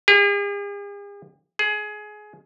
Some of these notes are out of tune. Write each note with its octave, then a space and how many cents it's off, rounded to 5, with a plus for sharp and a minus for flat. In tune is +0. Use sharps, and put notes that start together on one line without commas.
G#4 -45
G#4 +20